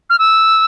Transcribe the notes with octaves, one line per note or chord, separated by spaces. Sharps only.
F6
E6